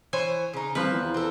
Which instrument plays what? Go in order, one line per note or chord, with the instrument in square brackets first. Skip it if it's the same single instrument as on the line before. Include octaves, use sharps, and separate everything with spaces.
[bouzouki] E3 C5 C#5 [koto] G#5
[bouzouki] C#3 D#4
[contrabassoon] C2 [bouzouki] D#3 [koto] F3 B4
[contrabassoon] E2
[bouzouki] C4 A4